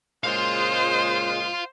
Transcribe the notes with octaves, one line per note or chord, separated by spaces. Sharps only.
A#2 C#3 G#3 C5 F5 C6